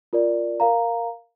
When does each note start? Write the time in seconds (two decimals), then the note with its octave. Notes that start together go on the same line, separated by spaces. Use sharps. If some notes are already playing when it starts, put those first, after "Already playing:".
0.13 F4 A#4 D5
0.60 A#4 F5 A#5